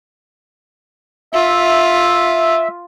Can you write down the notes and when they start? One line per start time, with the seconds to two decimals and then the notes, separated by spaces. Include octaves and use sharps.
1.33 F4 E5